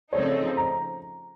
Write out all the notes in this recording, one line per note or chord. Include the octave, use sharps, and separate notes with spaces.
C#3 F3 A3 C4 D#4 C#5
A#5